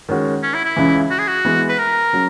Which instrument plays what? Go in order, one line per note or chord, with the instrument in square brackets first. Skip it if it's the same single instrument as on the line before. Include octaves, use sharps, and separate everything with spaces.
[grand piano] D#3 G#3 C#4 F#4
[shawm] C#4
E4
E4
[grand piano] C#2 C#3 E3
[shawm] F#4
G#4
F#4
[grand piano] E3 G#3 B3
[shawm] B4
A#4
[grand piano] C#3 F#3